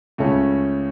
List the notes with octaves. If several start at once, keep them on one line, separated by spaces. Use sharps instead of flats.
C#2 C#3 A3 C#4